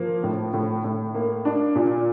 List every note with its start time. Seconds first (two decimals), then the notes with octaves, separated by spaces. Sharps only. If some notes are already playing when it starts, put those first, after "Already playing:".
Already playing: F3 A#3
0.23 A2
0.53 A2
0.84 A2
1.14 A#3
1.45 D4
1.75 A#2